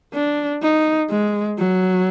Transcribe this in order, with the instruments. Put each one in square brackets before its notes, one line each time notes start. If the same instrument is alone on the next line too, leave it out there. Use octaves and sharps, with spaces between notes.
[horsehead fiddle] D4
D#4
G#3
F#3